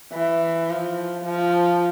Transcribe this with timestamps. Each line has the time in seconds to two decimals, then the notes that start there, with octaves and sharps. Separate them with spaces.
0.13 E3
0.70 F3
1.25 F3